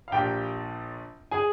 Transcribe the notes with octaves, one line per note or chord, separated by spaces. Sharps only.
F5
A#1 A#2 G4 G5
G#4 G#5